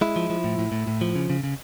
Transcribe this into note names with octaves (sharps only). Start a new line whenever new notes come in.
G#3 E4
F3
F3
A2
A2
A2
A2
F3
C#3
C#3
C#3